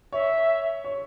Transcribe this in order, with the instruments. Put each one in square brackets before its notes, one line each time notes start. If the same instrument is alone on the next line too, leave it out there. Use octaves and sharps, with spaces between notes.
[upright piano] C#5 [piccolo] E5
[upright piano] C#5